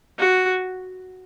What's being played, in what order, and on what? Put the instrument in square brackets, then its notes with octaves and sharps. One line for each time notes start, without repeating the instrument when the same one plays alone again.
[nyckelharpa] F#4